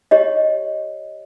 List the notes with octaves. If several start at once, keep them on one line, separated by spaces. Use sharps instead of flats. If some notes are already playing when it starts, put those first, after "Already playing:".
G4 C#5 D#5